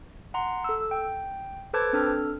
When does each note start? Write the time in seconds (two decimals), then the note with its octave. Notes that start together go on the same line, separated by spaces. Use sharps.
0.34 F#5 A#5 C6
0.64 A4 E6
0.91 G5
1.74 A4 B4 C5 A5 D6 G#6
1.93 C4 D4 A4 F6